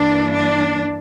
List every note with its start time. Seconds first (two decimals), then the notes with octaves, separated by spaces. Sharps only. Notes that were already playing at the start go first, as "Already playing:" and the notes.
Already playing: G2 E3 A#3 D4
0.33 D4